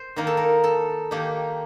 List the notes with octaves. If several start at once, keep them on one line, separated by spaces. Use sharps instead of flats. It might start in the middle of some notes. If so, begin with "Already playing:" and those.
Already playing: C5
D#3 A#3 D#4 A#4
A4
A#4
A4
D#3 A#3 D#4 G4